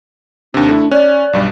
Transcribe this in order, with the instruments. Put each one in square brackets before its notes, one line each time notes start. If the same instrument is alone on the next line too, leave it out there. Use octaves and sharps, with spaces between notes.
[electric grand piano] D#2 C3 [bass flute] D4
[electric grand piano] A3 E4
[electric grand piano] C#4 F#6 [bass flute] D5
[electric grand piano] B1 G2 G3